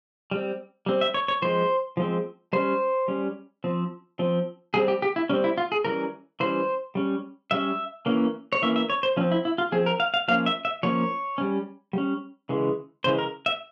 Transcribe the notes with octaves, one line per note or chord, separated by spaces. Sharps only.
G3 C4
G3 C4
E5
C#5
C#5
F3 G#3 C4 C5
F3 G#3 C4
G3 C#4 C5
G3 C#4
F3 C4
F3 C4
G3 C4 G#4
G4
G4
E4
G3 C4 C#4
E4
F4
G#4
E3 G3 C#4 A#4
E3 G3 C#4 C5
G3 C#4
G3 C#4 E5
E3 A#3 C#4
C#5
E3 A#3 C#4 E5
E5
C#5
C5
F3 C4 C#4
E4
E4
F4
F3 C4 G#4
A#4
F5
F5
F3 A#3 C#4 F5
E5
E5
F3 A#3 C#4 C#5
G3 C#4
G3 C#4
C#3 E3 G#3
C#3 E3 G#3 C5
A#4
E5